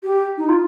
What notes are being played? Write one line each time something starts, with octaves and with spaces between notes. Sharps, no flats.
G4
D#4
F4